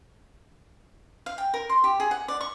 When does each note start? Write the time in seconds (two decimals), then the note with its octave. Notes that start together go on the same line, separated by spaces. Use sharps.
1.26 F5
1.38 G5
1.54 A#4
1.69 C6
1.84 G4
2.00 G#4
2.11 F#5
2.28 D5
2.41 C#6